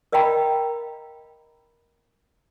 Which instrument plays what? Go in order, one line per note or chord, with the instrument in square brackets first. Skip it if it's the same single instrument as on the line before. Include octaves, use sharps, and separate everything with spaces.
[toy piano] A#4 D#5 F5 G5 A#5 B5